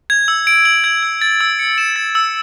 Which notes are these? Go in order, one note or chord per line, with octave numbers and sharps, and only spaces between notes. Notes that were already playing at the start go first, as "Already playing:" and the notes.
G#6
E6
D7
F#7
G#6
E6
A6
E6
C#7
E7
A6
E6